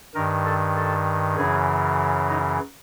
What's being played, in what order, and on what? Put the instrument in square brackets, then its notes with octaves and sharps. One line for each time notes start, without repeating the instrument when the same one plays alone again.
[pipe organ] G2 D#3 A#4
A4
A4
F#2 C#3 E3 G#4
D#4